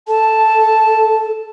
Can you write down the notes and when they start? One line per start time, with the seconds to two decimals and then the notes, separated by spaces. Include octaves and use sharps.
0.08 A4 A5